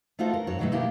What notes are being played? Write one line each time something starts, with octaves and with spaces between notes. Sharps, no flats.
A3 D#4 F4 F#4 A4 C5
A#4
F#2 F#4 C#5
B2 D#3 F#3 G#3 A3
B2 D#3 A#3 E4 G4